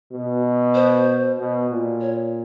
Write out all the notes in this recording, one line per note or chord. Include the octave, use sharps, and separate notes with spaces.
B2
C5
B2
A#2
C#5